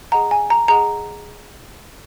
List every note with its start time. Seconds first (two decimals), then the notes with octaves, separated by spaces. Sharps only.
0.12 G#4 D#5 F#5 A#5
0.31 G#5
0.50 A#5
0.68 G#4 D#5 F#5 A#5